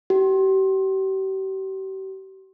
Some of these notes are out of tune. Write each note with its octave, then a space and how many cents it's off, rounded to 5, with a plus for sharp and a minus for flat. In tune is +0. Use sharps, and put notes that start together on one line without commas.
G4 -40